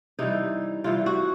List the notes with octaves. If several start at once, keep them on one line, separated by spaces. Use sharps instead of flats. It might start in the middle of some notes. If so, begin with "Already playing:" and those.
C3 E3 G3 D#4
C3 E3 G3 F4
F#4